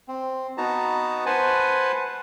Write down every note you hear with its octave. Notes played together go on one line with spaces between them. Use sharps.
C4
B3 D#4 F#4 A5 A#5
B4 C5 F#5 G#5 A5